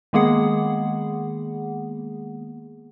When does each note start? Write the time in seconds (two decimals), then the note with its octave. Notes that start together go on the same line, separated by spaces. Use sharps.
0.13 D#3 G#3 A#3 B3 G#4 F#5